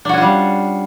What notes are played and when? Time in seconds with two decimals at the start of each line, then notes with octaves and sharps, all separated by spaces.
0.05 D4
0.09 F#4
0.13 C#4
0.17 F4
0.22 G3